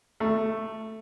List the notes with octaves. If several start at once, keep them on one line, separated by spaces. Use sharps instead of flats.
A3